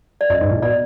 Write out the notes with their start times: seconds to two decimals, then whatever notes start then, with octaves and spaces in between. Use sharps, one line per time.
0.21 D5
0.30 F#2 D#5
0.41 G#2
0.51 A#2
0.62 B2 D5